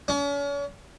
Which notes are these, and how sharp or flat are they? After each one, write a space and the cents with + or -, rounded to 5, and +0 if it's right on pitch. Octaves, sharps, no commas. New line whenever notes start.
C#4 +40